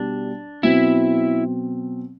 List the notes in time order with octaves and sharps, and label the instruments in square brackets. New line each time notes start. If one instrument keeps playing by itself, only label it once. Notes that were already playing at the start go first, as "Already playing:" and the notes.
Already playing: [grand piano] B2 G3 [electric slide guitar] D4
[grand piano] B2 F#3 C4 [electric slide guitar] E4